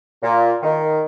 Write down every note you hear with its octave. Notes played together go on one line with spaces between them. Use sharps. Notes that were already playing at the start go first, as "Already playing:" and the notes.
A#2
D#3